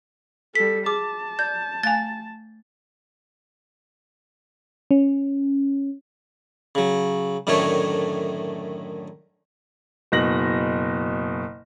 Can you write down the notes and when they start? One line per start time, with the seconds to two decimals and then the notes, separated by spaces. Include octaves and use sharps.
0.55 G3 A4 B6
0.86 G#4 A5 D6
1.39 D5 G6
1.83 A3 F5 G#5 A6
4.91 C#4
6.75 C#3 F#3
7.47 F#2 A2 D3 D#3 A3 C#5
10.12 F#1 B2 A#6 F#7